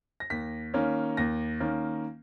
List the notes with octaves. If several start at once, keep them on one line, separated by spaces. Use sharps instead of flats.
A#6
D#2 B6
D#3 A#3 C#4
D#2 A#6
D#3 A#3 C#4